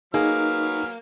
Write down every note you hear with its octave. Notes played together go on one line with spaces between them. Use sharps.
F#3 A#3 B3 D#4 G#4 F6